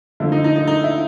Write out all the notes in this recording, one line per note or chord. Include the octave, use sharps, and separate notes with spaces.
D3 F3 A3 E4
D#4
D#4
D#4
D#4
E4